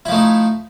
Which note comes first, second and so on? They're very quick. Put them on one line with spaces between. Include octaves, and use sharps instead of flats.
E4 F3 A3 D#4